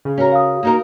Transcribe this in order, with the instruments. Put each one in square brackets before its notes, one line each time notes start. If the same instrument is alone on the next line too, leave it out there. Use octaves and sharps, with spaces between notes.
[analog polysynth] C#3
[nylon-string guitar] C#4 A#4 [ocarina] F#4
[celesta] F5 D#6
[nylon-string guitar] A#3 D#4 A#4 [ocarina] F#4